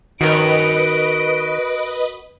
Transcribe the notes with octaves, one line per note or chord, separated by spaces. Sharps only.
D#3 F#4 A#4 B4 D#5 D7